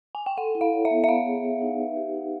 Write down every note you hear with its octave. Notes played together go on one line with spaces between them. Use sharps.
G#5
G5
A4 F#5
E4
F5
C#5
E5
B3
E5
C#5 F5
G#4
E5
D#4
B4
G4
D#4